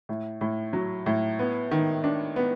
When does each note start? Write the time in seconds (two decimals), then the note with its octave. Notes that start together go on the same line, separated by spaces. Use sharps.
0.09 A2
0.41 A2
0.73 F#3
1.06 A2
1.39 B3
1.71 D#3
2.04 D4
2.36 B3